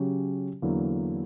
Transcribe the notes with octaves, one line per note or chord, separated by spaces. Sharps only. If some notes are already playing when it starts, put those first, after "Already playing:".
Already playing: C#3 F#3 C#4 G4
E2 D3 F#3 A#3 E4